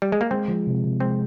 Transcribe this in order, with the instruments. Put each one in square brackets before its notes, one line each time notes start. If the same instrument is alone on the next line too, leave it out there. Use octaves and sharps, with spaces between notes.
[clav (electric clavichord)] G3
G#3
A#3
[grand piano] G#3 [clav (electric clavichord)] C4
[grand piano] F3
C3
C3
[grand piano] G#3 [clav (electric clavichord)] C4